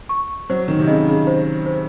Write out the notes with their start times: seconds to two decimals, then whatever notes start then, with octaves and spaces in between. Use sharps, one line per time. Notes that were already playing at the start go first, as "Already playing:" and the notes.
0.09 C#6
0.50 F#3 C5
0.68 D#3
0.79 C3
0.87 C#3 D#5
1.08 C#3
1.27 C5
1.66 C5